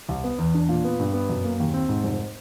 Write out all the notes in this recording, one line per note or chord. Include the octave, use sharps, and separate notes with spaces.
C2
B3
E2
D4
A#2
B3
G2
B3
F#2
A#3
D#2
C4
G#2
F1